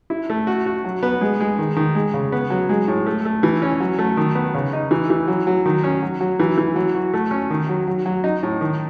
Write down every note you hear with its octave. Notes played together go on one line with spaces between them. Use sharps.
E4
A3
F#4
F#4
F#3
B3
G#3
G#3
D#3
D#3
G#3
C#3
B3
F#3
G#3
A2
A3
A3
E3
C#4
F#3
A3
D#3
B3
C#3
D#4
E3
E3
F#3
F#3
D#3
C#4
F#3
F#3
E3
E3
F#3
F#4
A3
C#4
D#3
F#3
F#3
F#3
D#4
A2
D#3